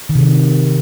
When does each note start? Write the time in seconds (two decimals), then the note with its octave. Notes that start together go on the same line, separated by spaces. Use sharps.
0.09 D#3
0.15 C3
0.21 D#3